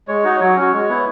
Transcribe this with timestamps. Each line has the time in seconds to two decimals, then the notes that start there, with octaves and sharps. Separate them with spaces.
0.08 G#3 C#5
0.24 D#4 F#4
0.40 F#3 C#5
0.56 C#4 F#4
0.73 G#3
0.89 B3 E4